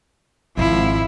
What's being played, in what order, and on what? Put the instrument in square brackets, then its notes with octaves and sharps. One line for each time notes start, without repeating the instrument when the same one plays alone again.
[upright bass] G#1 G#2 [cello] F3 E4